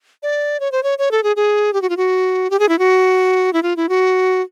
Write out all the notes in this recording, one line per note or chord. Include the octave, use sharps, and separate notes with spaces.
D5
C#5
C5
C#5
C#5
A4
G#4
G#4
G4
F#4
F4
F#4
G4
G#4
E4
F#4
E4
F4
E4
F#4